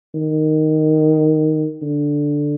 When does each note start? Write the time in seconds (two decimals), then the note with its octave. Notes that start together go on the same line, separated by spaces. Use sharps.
0.15 D#3
1.82 D3